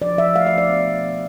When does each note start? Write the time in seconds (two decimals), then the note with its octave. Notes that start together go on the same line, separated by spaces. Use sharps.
0.02 F3 D5
0.18 F3 E5
0.35 A3 F5
0.47 E5
0.53 F3
0.58 D5
0.69 B3
0.86 B2
1.04 B3